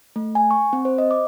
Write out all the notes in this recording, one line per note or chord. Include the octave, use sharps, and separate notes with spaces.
A3
G#5
C#6
C4
C5
D#5
D6